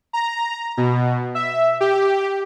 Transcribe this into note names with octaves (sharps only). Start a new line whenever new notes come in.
A#5
B2
E5
G4